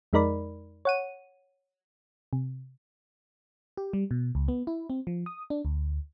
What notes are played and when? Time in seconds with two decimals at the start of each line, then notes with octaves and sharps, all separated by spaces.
0.13 F2 G#3 D#4 A#4 D5 B5
0.85 C#5 F#5 D#7
2.33 C3
3.77 G4
3.93 G3
4.11 B2
4.35 C#2
4.48 B3
4.67 E4
4.90 C4
5.07 F3
5.26 D#6
5.50 D4
5.65 D2